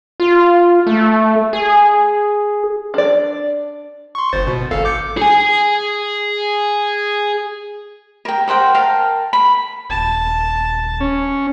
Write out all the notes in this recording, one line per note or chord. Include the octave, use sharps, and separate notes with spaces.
F4
A3
G#4
D4 D5
C6 C#6
G1 C5 A6
B2
G#1 A4 F5
D6 G6 C#7
G#4 G#5
A#4 G5
A#4 C5 F#5 G5
A#4 F5 G5 A5
B5
D#1 A5
C#4